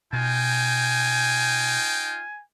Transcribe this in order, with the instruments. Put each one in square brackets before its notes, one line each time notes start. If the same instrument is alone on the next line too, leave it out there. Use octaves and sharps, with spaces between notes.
[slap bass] B2 [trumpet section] D#4 F4 G5 [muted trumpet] G#5